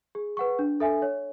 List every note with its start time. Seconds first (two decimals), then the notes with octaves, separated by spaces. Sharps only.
0.15 G#4
0.37 B4 F#5 C#6
0.59 D4
0.80 A4 E5 G#5
1.02 C#5